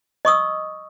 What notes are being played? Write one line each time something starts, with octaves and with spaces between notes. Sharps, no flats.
D#5 C#6 D#6 E6